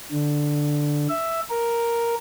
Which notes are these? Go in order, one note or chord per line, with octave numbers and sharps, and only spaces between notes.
D3
E5
A#4